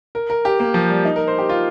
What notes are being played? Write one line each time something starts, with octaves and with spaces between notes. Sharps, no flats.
A#4
A#4
G4
A#3
F3
G3
D#4
A#4
C5
G4
F4